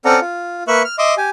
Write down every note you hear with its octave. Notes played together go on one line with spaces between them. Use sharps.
C4 C#4 A4 D5 F#5 A#5
F4
A#3 B4 E5 C#6 F#6
F6
D#5 E5 C6 D6
G4 G#5